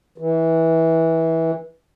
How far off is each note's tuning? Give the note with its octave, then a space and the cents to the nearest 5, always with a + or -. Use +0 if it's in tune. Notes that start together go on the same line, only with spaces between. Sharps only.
E3 -20